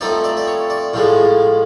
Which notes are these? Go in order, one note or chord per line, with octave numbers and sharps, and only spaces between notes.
F3 A3 C4 D#4 D5
D5
D5
C#5
D5
A2 F3 G#3